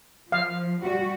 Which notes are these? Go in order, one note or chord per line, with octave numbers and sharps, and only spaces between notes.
F3 F5
G3 F#4